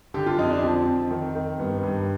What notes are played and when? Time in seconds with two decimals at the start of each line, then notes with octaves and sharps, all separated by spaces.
0.14 D3 G4
0.26 F4
0.38 F2 D#4
0.50 D4
0.62 F3 C4
0.86 F2
1.11 D#3
1.35 D#3
1.59 G2 B3
1.83 G2